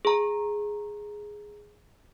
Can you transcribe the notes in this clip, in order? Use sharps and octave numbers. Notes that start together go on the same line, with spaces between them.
G#4 A#5